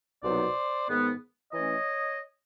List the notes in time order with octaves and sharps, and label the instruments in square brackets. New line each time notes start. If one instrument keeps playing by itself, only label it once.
[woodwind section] C2 B2 F#3 B3 D#4 C5 D5
G#2 D#3 G#3 B3
E3 A3 C#4 C#5 D#5